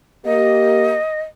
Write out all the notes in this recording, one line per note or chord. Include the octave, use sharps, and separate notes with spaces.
A#3 G4 D#5